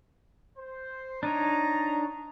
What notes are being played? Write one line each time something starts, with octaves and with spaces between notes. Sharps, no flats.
C5
D4 D#4 C#5 A#5